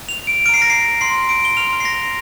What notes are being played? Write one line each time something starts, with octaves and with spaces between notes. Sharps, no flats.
F7
D7
A#5 F6 C7 D7
A#6
C7
C6 F6 C7
D7
G7
C6 F6 F7
C7
A#6